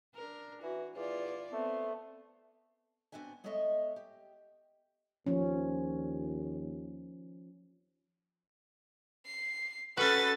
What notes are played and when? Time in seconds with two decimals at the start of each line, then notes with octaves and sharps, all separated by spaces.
0.15 D4 A#4
0.63 E3 F#4
0.96 E2 E4 F4 D5
1.53 A3 B3 C4
3.12 B3 C4 D4 F#4 E5 G#5
3.44 G#3 B3 A4 C#5 D#5 E5
3.96 G4
5.26 D#2 F3 C#4
9.26 C7
9.97 C#4 E4 F#4 A4 B4 A6